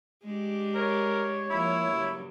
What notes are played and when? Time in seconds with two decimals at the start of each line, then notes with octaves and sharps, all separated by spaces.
0.25 G#3 D4 G4
0.75 A#4 C#5
1.50 F3 A#3 E4
1.88 G2 C#3 F#3